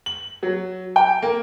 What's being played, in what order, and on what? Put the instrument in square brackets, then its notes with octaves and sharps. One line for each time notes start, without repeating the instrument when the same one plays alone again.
[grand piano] F#7
F#3
G5
A#3